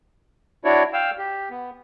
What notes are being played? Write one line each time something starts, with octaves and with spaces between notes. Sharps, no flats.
D4 E4 F#4 C#5 D5
F5 G5 E6
G4
B3